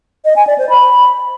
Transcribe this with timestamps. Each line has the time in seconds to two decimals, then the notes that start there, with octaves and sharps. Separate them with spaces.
0.25 D#5
0.36 G#5
0.47 D5
0.58 C5
0.69 B5